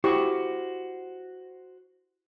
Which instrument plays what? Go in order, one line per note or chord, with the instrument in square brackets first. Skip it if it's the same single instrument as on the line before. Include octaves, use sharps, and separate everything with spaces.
[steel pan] E4 G4 C#6 [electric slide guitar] F#4 C5